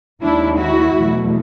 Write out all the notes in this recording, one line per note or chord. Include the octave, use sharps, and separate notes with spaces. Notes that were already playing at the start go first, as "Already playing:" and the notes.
D#2 D#3 G#3 D4 E4
E4 F#4
E2 B2 F#3 A3